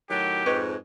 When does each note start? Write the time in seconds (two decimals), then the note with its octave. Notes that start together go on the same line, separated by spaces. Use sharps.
0.10 A2 D#3 F#3 G4
0.46 F2 G#2 B4 C#5 D#5